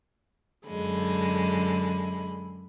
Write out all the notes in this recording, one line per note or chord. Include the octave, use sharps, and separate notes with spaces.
F#2 D3 G#3 B5